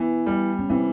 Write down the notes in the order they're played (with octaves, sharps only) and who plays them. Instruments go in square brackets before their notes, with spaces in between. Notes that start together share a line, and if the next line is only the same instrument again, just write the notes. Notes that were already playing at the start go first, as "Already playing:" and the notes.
Already playing: [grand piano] E3 [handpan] B3
[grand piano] G3
[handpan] C#4
[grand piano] E3 [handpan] C4